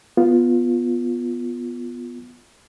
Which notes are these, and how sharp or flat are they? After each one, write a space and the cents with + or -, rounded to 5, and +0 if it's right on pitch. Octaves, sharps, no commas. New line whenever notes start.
B3 +0 F4 +0